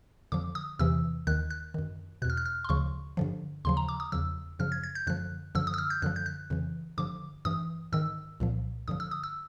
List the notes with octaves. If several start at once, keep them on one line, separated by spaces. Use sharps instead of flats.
F2 D3 F3 D6
D#6
E2 C3 E3 E6
D#2 D#3 F#6
F#6
F#2 D#3
E2 B2 F#6
F6
F#6
F6
C6
D2 C#3 F3 C#6
G2 D3 F3
D#2 C#3 F3 C6
A#5
D6
D#6
E2 C#3 F3 E6
F#2 C#3 F3 F6
G#6
G#6
G6
F#2 D3 F3 F#6
F#2 D3 F3 E6
D#6
E6
F6
G6
F#2 D3 F3 F#6
G6
F#6
F2 C#3 E3
G2 D3 F3 D6
G2 E3 D#6
G#2 D#3 E6
C2 A#2 F3
G2 D3 F3 D#6
E6
D#6
E6